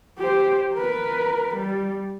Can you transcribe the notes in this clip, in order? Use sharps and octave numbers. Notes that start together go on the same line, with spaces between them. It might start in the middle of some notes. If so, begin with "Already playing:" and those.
G4 C5
A#4 B4
G3